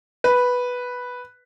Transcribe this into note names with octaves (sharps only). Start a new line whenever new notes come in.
B4